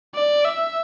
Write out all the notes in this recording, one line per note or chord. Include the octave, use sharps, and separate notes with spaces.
D5
E5